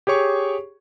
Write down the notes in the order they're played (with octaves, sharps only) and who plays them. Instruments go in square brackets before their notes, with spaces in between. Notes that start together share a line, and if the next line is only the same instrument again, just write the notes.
[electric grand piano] G4 G#4 C#5 C#6